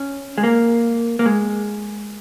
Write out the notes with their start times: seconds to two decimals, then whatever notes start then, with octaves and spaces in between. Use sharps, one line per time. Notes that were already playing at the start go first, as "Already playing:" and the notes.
Already playing: C#4
0.38 G#3
0.43 A#3
1.19 A#3
1.26 G#3